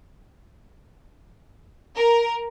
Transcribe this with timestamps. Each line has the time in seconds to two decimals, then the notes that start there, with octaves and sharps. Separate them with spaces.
1.96 A#4